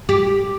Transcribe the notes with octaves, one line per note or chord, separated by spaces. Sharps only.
G4